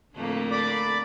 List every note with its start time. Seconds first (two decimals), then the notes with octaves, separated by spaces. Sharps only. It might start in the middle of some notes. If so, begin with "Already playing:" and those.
0.15 F2 A2 D3 A3 A#3
0.51 D5 B5 D6